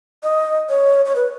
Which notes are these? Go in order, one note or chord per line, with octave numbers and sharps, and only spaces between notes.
D#5
C#5
C#5
B4